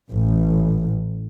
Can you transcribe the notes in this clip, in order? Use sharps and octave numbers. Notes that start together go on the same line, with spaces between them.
A1